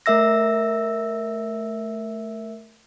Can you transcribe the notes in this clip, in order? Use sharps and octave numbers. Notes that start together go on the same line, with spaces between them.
A3 A#4 E5 E6 A#6